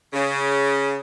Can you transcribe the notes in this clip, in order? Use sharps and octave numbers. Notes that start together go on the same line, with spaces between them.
C#3